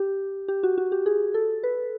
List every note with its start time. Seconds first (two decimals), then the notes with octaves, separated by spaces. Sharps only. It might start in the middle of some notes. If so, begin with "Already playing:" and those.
Already playing: G4
0.48 G4
0.63 F#4
0.78 F#4
0.92 G4
1.06 G#4
1.34 A4
1.63 B4